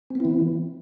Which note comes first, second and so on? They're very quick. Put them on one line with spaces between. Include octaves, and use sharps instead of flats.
C4 B3 E4 E3